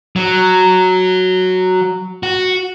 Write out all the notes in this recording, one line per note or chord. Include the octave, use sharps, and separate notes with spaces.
F#3
F#4